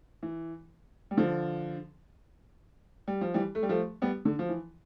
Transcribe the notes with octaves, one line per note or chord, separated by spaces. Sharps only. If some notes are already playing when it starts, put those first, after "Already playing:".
E3
G3
D3 F3
G3
F3
E3 G3
A3
G3
F3 A3
G3 B3
D3
F3
E3